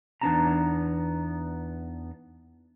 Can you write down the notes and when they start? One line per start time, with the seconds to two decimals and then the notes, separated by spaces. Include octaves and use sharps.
0.21 E2 B3 D4 D#4 A5 A#5